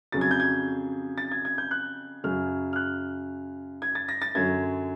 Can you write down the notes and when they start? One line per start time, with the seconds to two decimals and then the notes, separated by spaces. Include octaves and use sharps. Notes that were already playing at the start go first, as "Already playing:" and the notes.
0.12 F2 C#3 F#3 A6
0.21 G#6
0.31 G6
0.40 G#6
1.18 A6
1.32 G#6
1.45 G#6
1.58 G6
1.71 F#6
2.24 F#2 C#3 F#3 F6
2.73 F6
2.76 F#6
3.82 G#6
3.95 A6
4.09 A#6
4.22 A6
4.35 F#2 D3 F#3 G#6